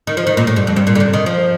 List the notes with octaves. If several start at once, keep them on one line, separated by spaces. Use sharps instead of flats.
D#3
F3
D#3
A#2
A2
G2
F2
G2
A#2
D3
C3
D#3
F3